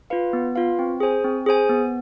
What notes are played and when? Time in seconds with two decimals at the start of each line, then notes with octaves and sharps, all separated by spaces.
0.10 F4 B4 F5
0.33 B3
0.55 F4 B4 F5
0.79 C4
1.00 G#4 C5 G#5
1.24 C4
1.46 G#4 C5 G#5
1.69 B3